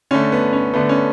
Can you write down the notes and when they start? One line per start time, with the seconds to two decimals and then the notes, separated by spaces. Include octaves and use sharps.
0.11 D3 A3 C#4
0.32 B3
0.53 C#4
0.74 D3 A3 B3
0.89 C#4